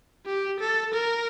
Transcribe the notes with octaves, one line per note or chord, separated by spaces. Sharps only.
G4
A4
A#4